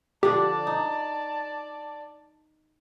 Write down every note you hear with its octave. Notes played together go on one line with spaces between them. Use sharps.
D3 F3 D4 G4 D5 A5
D#4